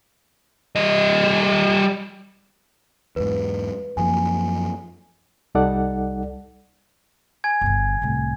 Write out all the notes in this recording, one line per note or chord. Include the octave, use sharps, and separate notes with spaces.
G3 D#5
E2 G#2 B4
F#2 F3 A#3 G#5
C2 G3 D#4 A4 D5 F#5
G#5 G#6
G1 D3
C2 A2